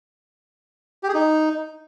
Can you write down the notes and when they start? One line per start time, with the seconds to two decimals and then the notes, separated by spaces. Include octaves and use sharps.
1.03 G4
1.09 G#4
1.14 D#4